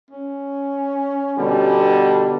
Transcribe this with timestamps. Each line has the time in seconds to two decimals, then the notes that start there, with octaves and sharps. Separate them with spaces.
0.11 C#4
1.36 B2 D3 G3